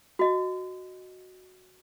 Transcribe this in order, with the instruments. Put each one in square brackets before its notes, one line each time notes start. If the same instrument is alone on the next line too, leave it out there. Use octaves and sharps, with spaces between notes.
[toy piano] F#4 D#5